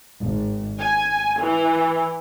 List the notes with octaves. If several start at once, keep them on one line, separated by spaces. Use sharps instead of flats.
G#1
G#5
E3